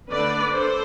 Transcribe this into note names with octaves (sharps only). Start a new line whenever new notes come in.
D3 A3 D4 B4 D5
A4 C5